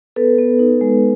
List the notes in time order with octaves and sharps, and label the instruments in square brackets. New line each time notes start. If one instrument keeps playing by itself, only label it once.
[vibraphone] B3 A4 B4
B3
D#4
G#3